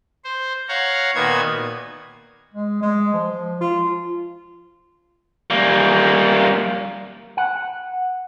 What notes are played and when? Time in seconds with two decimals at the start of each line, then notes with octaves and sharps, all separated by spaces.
0.24 C5
0.69 C#5 F5 F#5 A#5
1.15 A#2 D#3 B3 F#4 G#6
2.54 G#3
2.82 G#3
3.14 F3
3.61 F4
5.51 G3 A#3
7.37 F#5